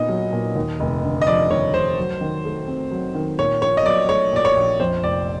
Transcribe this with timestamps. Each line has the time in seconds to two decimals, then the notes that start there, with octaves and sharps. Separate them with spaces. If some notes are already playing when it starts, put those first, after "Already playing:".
Already playing: A#2 B3 D#4 D#5
0.09 F#3
0.32 A#2
0.56 D#2
0.80 F1
1.03 D3
1.21 D#5
1.26 F3 D5
1.50 D#2 C#5
1.73 F1 C5
1.98 F#3
2.21 D#3
2.45 A3
2.67 C4
2.91 F#3
3.15 D#3
3.39 A#2 C#5
3.62 A#1 C#5
3.77 D#5
3.85 F#3 D5
4.09 A3 C#5
4.33 A#2 D5
4.45 C#5
4.56 A#1
4.80 F2 C5
5.03 F1 D5